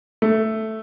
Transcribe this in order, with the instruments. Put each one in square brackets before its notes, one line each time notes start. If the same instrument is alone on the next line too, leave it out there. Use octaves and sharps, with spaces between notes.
[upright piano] A3